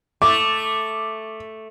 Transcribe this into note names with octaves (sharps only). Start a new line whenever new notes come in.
A3 D6